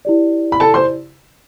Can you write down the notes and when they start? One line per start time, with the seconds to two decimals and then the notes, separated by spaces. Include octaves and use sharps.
0.05 E4 G4 D5
0.52 B5
0.60 A4 A5
0.74 C5 C6